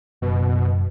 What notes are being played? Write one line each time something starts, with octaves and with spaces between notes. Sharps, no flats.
F#1 B2